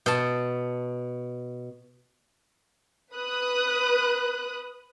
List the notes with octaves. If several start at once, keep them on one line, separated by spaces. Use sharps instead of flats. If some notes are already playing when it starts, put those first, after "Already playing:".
B2 A5
B4 D#6 F#6